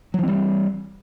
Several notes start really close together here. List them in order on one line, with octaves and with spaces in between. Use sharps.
F#3 E3 C4 G3